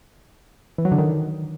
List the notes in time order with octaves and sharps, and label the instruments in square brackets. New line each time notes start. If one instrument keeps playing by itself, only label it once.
[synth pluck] E3
F#3
D3
D#3